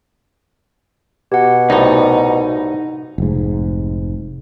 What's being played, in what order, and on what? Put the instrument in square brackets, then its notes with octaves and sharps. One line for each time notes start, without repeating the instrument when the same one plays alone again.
[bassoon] B2 [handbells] G4 F#5
[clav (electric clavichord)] C2 A2 [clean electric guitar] D#4
[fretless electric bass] F1 G#2